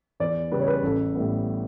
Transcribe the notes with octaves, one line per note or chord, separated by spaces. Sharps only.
E2 D5
C#3 G3 B4
C#5
B4
A1 A4
A2 G3 B3